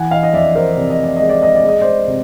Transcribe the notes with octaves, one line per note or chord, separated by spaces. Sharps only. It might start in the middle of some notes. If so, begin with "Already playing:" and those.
Already playing: E3 F#5 G#5
D#5 F5
D#5
F2 D5 E5
A#4 C5
C3 D5
D#5
D5
G#3 D#5
D5
D#5
D5
G#3
D#5
C5 D5
C3